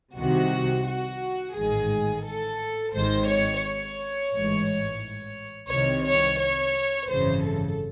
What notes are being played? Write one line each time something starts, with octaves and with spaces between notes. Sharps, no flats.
C2 C3 D#3 F#4
F#4
A1 G#2 D#3 G#4
A4
G#1 G#2 D#3 C5
C#5
C#5
A1 G#2 E3
C2 C3 D#3 C#5
C#5
C#5
G#1 F#2 C#3 E3 C5
A4